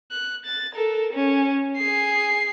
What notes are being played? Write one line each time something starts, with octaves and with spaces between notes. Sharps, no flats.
F#6
A6
A4 A#4
C#4
G#4 C7